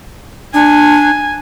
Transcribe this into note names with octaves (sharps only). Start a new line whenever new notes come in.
D4 G#5